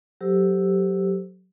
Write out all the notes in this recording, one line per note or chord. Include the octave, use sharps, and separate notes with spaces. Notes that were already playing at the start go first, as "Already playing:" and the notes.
F#3 G4 A4 C5 E6